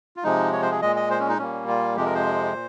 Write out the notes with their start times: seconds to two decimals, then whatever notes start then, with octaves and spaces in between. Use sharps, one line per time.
0.16 F4
0.24 C3 F3 G#3 D#4
0.53 C#5
0.62 C5
0.72 G#4
0.82 A#2 G#3 D#5
0.96 D#5
1.10 C5
1.19 C#4
1.29 D#4
1.39 A#2 G3 A#3 C#4
1.68 F4
1.96 F2 C3 F3 G#3 G4
2.06 A#4
2.15 C5
2.53 A#2